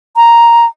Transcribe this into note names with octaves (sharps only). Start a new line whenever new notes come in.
A#5